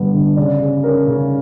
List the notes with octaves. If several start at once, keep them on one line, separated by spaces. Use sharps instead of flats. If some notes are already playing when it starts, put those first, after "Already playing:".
Already playing: G2 D3 B3
D3
C#3 D5
C#3
C#4 A#4
C#3